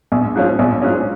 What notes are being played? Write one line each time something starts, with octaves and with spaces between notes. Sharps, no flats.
A#1
G#2 F3 C#4
A#1
G#2 F3 C#4